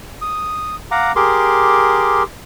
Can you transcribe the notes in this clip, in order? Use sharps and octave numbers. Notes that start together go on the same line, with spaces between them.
D#6
F5 F#5 A#5 D6
G4 G#4 A#4 C6 D6